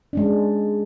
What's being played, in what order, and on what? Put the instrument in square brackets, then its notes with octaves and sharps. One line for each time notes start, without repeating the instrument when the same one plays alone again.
[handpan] G#3 C#4 D4